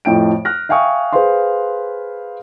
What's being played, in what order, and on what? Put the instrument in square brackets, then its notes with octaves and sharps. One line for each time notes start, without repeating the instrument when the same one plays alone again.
[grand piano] F2 A2 G5 D7
F6 F#6 A#6
E5 F5 G5 G#5 C#6 D#6
G#4 B4 C5 F5 C6